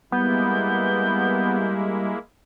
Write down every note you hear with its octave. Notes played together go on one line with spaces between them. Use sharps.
G3 G#3 A#3 B3 E4 G6